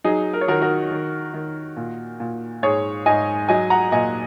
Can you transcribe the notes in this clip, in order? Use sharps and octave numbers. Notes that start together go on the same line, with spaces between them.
F#3 D#4 G#4
A#4
C#5
D#3 F#4 A#4
F#4 A#4
D#3
D#3
A#2
A#2
G#2 G#4 C#5
G#2 D#5 G#5
F#3 D#5 G#5
F#5 A#5
A#2 D#5 G#5